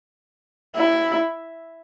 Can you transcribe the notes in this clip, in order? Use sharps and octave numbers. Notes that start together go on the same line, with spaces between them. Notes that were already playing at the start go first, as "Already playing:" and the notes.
E4